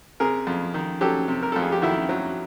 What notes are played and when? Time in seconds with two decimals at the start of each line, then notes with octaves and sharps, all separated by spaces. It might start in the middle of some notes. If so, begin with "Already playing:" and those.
0.20 C3 G#4 A#4
0.47 F2
0.74 D#3
1.01 F#3 G4 A4
1.28 C3
1.43 A#4
1.52 F2 A4
1.62 G#4
1.72 G4
1.82 D#3 E4 F#4
2.09 F#3